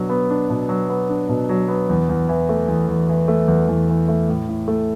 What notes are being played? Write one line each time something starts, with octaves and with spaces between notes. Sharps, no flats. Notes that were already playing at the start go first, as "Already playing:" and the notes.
Already playing: B2 F#3 D4
B3
D4
B2
F#3
B3
D4
B2
F#3
B3
E2
E2
E3
A3
E2
E2
E3
A3
E2
E2
E3
A3
A2
A2
A3